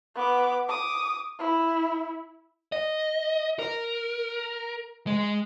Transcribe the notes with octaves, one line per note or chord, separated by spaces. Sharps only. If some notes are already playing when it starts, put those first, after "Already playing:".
B3 D6
D6 D#6
E4
D#5
A#4
G#3